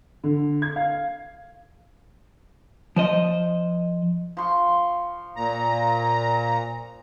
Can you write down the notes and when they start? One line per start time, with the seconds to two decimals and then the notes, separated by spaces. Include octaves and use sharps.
0.24 D3
0.62 G#6
0.76 F5
2.96 F3 C5 D#5
4.37 F3 C6 C#6
5.36 A#2 A#5